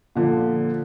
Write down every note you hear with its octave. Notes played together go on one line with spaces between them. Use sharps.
A#2 D3 F3